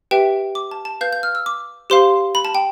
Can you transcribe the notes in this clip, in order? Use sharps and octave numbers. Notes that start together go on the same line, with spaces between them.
G4 B4 E5 G5
D6
A5
A5
B4 F5 G6
G6
F6
E6
D6
G4 C5 F5 C6
B5
A5
G5